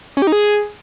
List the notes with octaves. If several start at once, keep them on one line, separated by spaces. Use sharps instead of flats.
C#4
G4
D#4
G#4